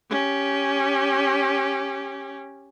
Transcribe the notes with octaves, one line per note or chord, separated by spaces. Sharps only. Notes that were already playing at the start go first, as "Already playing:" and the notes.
C#4 G4